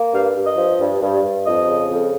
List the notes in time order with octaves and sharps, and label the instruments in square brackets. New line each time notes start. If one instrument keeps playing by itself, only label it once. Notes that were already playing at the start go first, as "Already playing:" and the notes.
Already playing: [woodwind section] A#3
G2 F5
G2
D#5
F3
G2
G2
G2
F2 D#5
C#3
F2